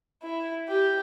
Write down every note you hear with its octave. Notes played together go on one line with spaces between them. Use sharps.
E4
G4